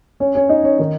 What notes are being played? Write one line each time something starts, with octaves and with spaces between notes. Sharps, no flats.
C#4 C#5
C#4 C#5
D#4 D#5
C#4 C#5
D#3 D#4